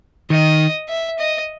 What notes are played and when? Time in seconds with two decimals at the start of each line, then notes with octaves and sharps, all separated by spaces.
0.30 D#3 D#5
0.89 E5
1.19 D#5